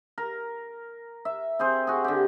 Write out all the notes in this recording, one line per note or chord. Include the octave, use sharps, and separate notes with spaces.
A#4
E5
C4 G#4 C5
F#4 G#4
D3 G4